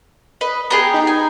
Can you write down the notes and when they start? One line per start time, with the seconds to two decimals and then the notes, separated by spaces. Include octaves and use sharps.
0.41 B4 D#5
0.70 B3 G4 G#4 A#5
0.94 D#4
1.07 G#5